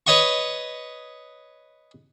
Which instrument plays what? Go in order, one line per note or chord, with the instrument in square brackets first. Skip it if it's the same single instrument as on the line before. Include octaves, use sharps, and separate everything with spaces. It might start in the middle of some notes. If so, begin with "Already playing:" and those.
[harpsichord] B4 C#5 D#5 F#5 C#6